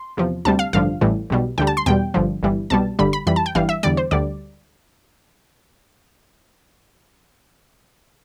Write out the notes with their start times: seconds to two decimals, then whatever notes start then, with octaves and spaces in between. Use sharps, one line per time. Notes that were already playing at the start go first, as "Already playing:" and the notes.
Already playing: C6
0.17 E2 C3 F3
0.45 D2 C3 G3 A5
0.59 F5
0.73 A1 G2 D3 F3 F5
1.01 A1 A2 E3 G3
1.30 B1 B2 G3
1.58 D2 D3 G3 G5
1.67 A5
1.77 C6
1.86 E2 B2 G3 G5
2.14 G1 G2 D3 F3
2.43 G1 G2 E3 G3
2.70 C2 B2 G3 A5
2.99 G1 G2 D3 G3 B5
3.13 B5
3.27 F2 E3 G3 B5
3.36 A5
3.46 G5
3.55 G1 G2 E3 G3 F5
3.69 E5
3.83 E2 D3 G3 D5
3.97 C5
4.11 D2 D3 G3 D5